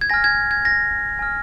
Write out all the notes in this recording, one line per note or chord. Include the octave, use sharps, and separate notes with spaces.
G#6
G#5 F6 A#6
G#6
G#6
A#6
G#5 F6